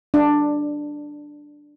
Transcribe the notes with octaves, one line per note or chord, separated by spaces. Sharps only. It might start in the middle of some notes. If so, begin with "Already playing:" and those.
D4